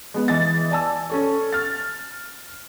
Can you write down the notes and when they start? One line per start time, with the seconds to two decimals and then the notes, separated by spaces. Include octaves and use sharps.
0.14 G#3 B3
0.28 E3 D#5 A6
0.71 D5 G#5 A5 E6
1.10 C#4 A4 C#5
1.52 F6 A6